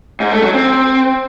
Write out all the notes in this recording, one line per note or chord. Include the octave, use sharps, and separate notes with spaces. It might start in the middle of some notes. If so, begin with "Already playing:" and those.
G#2
A3
F#3
C4